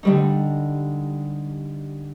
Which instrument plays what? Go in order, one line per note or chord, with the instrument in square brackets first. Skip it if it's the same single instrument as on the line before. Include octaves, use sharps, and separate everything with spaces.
[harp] D3 G3 D#4